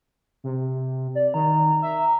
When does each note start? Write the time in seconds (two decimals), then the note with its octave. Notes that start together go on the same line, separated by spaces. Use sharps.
0.44 C3
1.15 D5
1.34 D#3 A#5
1.82 E5